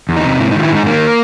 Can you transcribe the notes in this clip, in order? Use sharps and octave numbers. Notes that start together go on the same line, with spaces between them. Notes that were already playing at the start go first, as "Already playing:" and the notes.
E2
D#4
C3
G#2 E4
D#4
D#3 F4
E4
G#2 D#4
D#3 A#3